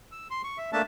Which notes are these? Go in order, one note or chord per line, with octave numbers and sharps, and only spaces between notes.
E6
C6
C#6
E5
A3 A#3 D4 E5 A5